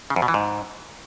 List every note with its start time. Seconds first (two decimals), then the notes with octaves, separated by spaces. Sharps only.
0.10 C#3
0.16 F2
0.22 B2
0.28 E3
0.34 G#2